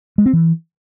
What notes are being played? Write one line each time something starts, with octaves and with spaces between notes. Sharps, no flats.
G#3
C4
E3